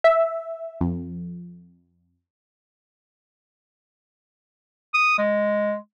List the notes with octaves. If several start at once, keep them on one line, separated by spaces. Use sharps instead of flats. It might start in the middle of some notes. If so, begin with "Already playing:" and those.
E5
F2
D#6
G#3